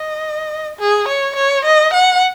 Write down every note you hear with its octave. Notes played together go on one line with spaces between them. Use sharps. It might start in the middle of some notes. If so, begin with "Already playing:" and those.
Already playing: D#5
G#4
C#5
C#5
D#5
F#5